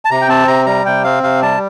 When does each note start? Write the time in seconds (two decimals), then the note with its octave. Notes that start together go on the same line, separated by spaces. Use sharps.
0.05 A5
0.11 C3 A#5
0.21 G5
0.28 C4 A5
0.47 C3 A#5
0.66 G3 A#5
0.85 C3 G5
1.04 C4 F5
1.23 C3 F5
1.42 G3 A5